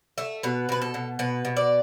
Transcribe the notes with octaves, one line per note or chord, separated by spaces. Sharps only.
A3 E5
B2 B4
B2 B4
A4
B2
B2 B4
B2
D5